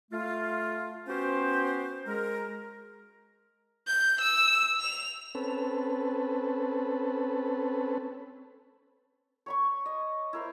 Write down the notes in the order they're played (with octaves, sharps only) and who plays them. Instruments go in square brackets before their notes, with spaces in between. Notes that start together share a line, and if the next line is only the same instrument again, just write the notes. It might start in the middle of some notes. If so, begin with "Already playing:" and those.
[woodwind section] A3 F4
B3 C#4 F#4 G4 C5
G#3 A#4
[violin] G6
E6
F7
[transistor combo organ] C4 C#4 A4 B4
[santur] C#5 B5 C#6
D#5
E4 A#4 C5